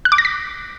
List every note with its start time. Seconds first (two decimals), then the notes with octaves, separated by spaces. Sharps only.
0.05 F#6
0.12 D6
0.18 A#6
0.25 B6